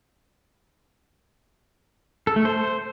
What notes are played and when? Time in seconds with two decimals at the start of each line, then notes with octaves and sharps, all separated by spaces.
2.27 A4
2.36 A3
2.45 C5